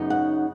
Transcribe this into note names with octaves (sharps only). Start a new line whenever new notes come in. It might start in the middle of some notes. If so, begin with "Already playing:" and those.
Already playing: F#2 C#3 B3 D#4
F#5